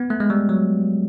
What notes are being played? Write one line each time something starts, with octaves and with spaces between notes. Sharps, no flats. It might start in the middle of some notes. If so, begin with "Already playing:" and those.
Already playing: B3
A3
G#3
G3
F#3